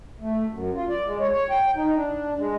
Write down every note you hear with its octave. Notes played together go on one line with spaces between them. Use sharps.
A3
F#2
F4
D5
G#3
C#5
C#5
G5
D#4
D4
G#3